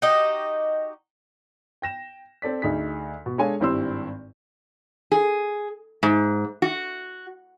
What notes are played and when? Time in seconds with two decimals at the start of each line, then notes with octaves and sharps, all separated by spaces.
0.02 D#4 F#4 G4 D#5
1.82 G5 A#6 E7
2.42 C4 A4 D5 B6
2.62 D2 D#4 G#4 B6
3.26 B2
3.38 G#3 D4 A4 C#5 F5 G#5
3.60 G#1 G2 C4 E4 C6 E6
5.12 G#4
6.03 G#2
6.62 F#4